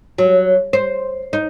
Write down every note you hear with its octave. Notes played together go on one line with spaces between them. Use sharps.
F#3
C5
D#4